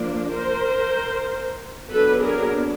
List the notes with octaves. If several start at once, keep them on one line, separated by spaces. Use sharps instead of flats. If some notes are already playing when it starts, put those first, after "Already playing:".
Already playing: F3 A#3 D4
A#4 C5
F#3 B3 D4 A4 B4
G#4 A#4